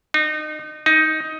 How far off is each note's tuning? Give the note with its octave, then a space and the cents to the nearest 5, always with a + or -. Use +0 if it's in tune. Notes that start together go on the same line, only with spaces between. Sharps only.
D#4 -30
D#4 +10